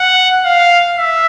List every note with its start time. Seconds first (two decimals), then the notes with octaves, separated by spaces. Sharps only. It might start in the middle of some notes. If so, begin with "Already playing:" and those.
Already playing: F#5
0.45 F5
0.97 E5